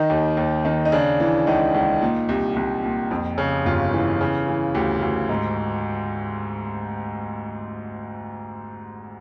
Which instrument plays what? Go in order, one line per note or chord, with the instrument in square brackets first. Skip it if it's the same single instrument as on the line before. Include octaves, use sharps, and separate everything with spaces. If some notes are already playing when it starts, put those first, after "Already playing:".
Already playing: [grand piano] D#3 D#4
D#2
D#2
D#3
D#4
C#3 D4
E3
C#2 D#4
C#2
A#2
C2
C2
A#2
F2
C#3
G1 F4
E3
C#3
E3
D2 G4
D2
G#2